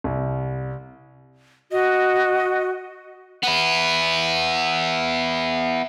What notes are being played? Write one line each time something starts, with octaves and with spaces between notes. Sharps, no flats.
C2
F#4 D#5
B3 E4